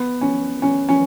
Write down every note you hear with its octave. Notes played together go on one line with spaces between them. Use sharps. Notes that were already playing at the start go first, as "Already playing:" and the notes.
Already playing: B3
C#4
C#4
C#4